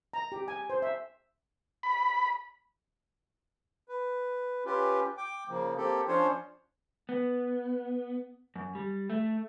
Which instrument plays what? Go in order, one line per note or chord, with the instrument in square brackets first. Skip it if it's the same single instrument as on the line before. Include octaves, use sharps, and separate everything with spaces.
[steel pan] A#5
G4
G#5
C5
E5
[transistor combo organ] B5
[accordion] B4
C#4 F4 G4 B4
G5 D6
C#3 F3 A#3
A#3 C4 G4 A4
F3 C#4 D4 F4 C5 C#5
[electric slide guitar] B3
F#2
G3
A3